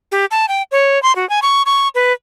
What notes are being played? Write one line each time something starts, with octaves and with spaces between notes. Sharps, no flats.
G4
A5
G5
C#5
C6
F#4
G#5
C#6
C#6
B4